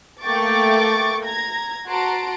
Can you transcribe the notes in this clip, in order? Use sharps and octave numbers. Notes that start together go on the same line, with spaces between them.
A3 A#3 G5 C#6 D6 A6
A#5 G#6 A#6
F#4 A5 A#5 C6 D7